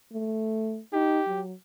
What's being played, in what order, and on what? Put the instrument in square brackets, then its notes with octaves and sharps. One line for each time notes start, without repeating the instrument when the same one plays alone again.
[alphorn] A3
[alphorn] D#4 [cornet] G4
[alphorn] F#3